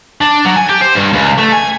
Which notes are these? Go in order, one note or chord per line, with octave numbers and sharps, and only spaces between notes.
D4
F#3
G#5
G4
C5
G2
C#2
A3
G#5